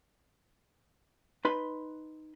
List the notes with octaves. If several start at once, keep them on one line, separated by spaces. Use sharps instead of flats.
D#4 B4 B5 C6